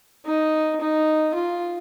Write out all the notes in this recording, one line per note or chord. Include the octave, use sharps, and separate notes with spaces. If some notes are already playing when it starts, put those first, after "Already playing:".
D#4
D#4
F4